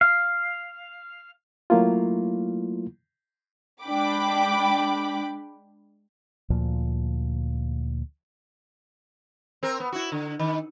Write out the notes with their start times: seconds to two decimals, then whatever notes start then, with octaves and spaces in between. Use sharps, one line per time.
0.01 F5
1.70 F#3 A3 A#3 E4 F4
3.83 G#3 D4 G5 B5 D6
6.50 D2 A#2 F3
9.63 C4 A#4
9.80 B3
9.92 E4 F#4
10.12 D3
10.39 D#3